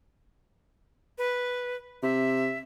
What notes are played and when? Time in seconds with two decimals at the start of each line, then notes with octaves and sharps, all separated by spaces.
1.18 B4
2.03 C3 E5